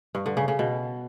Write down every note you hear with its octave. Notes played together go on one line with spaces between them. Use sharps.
G2
D3
C#3
C#3
B2